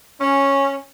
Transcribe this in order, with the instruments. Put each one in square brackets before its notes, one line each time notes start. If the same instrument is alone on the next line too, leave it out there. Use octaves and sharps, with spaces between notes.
[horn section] C#4